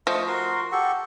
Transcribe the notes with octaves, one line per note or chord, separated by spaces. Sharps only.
F3 A3 D#5 C#6
F#4 A#4 C6
G4 A4 F#5 C#6